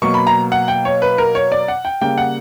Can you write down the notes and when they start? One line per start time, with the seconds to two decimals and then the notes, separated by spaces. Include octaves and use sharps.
0.02 B2 F#3 A#3 C#6
0.14 B5
0.27 A#5
0.52 F#5
0.68 G5
0.85 C#5
1.02 B4
1.18 A#4
1.35 C#5
1.52 D5
1.68 F#5
1.85 G5
2.01 C#3 G3 A#3 G5
2.18 F#5